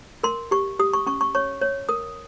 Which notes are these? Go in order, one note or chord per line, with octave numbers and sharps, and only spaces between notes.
A#4 C6
G4 C#6
G4 D#6
C#6
C#4 C#6
C#6
C#5 C#6
C#5
A#4 D#6